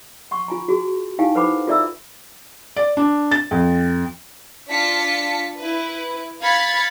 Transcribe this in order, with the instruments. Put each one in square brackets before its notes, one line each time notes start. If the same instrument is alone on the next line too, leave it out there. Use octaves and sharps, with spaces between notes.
[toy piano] F#5 C6 C#6
F4 G#5 A#5
F#4 G#4
D#4 E4 G4 F5 G5 G#5
A4 B4 C5 F#5 B5 D6
F4 A4 D5 E5 A#5 E6
[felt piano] D5
D4
A6
F2
[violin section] D4 F4 A5 B6 C#7
E4 B4
F5 B5 G#6 A6 C#7